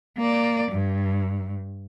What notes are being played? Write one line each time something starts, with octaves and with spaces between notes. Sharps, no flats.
A#3 D5
G2